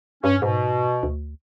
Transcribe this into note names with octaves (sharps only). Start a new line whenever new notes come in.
G2 C#4
G#2 B2
D2